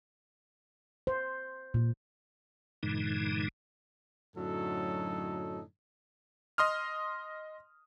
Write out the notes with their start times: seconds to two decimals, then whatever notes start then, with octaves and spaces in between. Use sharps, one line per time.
1.07 C5
1.74 A#2
2.83 G2 A#2 D3 E3 G#3 D#4
4.36 F#2 A2 D3 F#3 D#4 A4
6.58 D#5 C6 D#6 F6